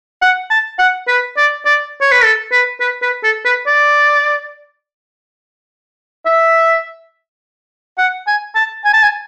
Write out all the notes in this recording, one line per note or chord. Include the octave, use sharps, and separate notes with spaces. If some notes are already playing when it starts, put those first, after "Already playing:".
F#5
A5
F#5
B4
D5
D5
C#5
B4
A4
B4
B4
B4
A4
B4
D5
E5
F#5
G#5
A5
G#5
A5
G#5